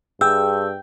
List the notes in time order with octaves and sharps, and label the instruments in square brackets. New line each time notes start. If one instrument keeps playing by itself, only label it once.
[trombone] G2 [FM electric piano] G#4 [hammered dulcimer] G5 [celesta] E6